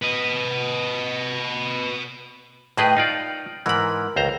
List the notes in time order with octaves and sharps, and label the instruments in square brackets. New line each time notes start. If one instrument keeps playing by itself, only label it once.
[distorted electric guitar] B4 D#5
[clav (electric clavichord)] A2 G#4 B4 [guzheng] D#5 G5
[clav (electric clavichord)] D#4 F4 D5
[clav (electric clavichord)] G#2 E3 [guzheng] A#4 B5
[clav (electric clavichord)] C#2 C5 A#5